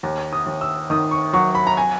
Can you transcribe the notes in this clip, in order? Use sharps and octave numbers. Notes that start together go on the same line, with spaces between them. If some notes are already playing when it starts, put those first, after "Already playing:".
D#2
D#6
D#2
E6
D#3 D#6
C#6
F#3 C#6
B5
A#5
G#5